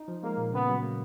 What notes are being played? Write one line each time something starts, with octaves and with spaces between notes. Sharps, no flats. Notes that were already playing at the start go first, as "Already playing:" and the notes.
Already playing: D#4
F3
G#3 A#3
A#2
C#3 B3
F#3
A#3